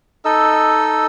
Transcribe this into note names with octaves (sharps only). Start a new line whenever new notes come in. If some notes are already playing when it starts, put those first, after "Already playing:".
D#4 A4 D#5 E6